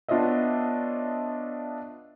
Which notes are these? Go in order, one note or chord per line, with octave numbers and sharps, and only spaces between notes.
B3 D4 F4 C#5 D#5 E5